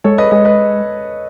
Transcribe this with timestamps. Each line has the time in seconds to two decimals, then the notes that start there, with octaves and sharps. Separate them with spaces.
0.04 G#3 A4 C#5
0.18 B4 D#5
0.31 G#3 B4 D#5
0.45 B4 D#5